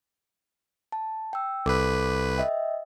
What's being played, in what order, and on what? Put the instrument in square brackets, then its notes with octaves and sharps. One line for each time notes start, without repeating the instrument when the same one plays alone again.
[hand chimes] A5
G5 E6
[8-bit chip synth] C2 B4 [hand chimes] A4 D6
[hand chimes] D#5 E5 G5